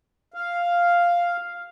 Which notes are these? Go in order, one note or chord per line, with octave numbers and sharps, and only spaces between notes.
F5